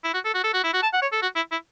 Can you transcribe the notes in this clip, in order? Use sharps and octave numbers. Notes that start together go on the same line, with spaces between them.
E4
F#4
A4
F#4
A4
F#4
E4
F#4
A5
F#5
C#5
A4
F#4
E4
E4